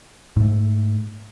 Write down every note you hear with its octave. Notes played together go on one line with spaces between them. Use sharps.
G#2 A3